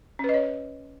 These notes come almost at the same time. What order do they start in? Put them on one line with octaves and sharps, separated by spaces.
C#4 B4 D#5 C#5